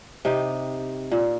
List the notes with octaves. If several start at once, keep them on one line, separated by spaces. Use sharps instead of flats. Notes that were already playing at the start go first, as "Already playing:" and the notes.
C3 D#4 G4
A#2